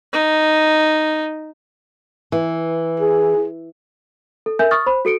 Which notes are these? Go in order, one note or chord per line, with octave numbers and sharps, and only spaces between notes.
D#4
E3
G#4
A4
A#4 E5 G#5 G6
C#6 D#6 F6 A6
C5 B5
F#4 A4 C#7 D7